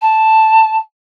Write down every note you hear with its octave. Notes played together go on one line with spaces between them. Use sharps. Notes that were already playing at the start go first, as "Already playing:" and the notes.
A5